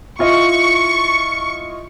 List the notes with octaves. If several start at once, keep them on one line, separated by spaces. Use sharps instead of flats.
E4 F4 D#5 C#6